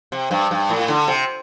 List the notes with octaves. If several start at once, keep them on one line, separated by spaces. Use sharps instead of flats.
C3
G2
G2
A2
D3
C3